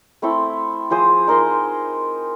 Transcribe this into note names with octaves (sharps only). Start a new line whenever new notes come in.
A3 C4 E4 A4
F3 G#4 C5 D#6
D#4 A#4 D#5 C6